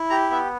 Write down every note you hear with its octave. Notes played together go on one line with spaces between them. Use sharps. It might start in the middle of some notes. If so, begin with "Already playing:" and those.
Already playing: E4
G4 A#5
B3 E5